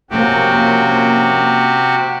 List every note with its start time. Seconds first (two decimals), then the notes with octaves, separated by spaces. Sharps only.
0.11 C3 F3 A#3 C#4 F#4 G4